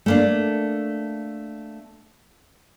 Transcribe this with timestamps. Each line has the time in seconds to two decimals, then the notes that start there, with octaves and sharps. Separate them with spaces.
0.06 A3 A#3 D4